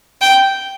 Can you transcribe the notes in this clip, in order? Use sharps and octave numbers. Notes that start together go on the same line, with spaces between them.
G5